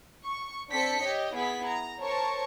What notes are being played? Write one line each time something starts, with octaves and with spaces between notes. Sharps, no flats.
C#6
C4 D4 A4 B6 C#7
G4 C#5 D#5
B3 E4 G#4 B6
A#5
A#4 C5 C#5 A5 C#6